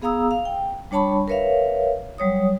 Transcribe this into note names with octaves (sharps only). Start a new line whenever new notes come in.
B3 G#4 F5 A#5 D#6 E6
F5
G5
G3 D4 C#5 A5 B5 C#6
A#4 B4 C#5 E5 F5
F#3 G3 C#5 D#6